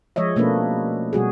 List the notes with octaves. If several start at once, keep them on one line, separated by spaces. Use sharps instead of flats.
F3 G#3 C#5 D#5 E5
B2 A3 A#3 C#4 D4 B4
B2 G3 F#4 G#4